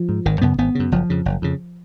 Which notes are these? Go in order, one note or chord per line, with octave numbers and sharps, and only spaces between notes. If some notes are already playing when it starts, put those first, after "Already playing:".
Already playing: F3
G#2
G#1 D#3
F#2 C#3 B3
G#1 B3
F#2 C#3
F#1 F3
F2 C#3
F#1
F2 C#3